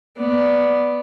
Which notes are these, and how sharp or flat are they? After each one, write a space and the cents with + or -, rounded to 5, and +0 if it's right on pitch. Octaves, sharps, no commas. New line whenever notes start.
B3 +0 D5 +0